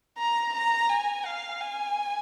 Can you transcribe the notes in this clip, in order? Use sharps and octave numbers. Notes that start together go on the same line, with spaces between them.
A#5
A#5
G#5
F5
G#5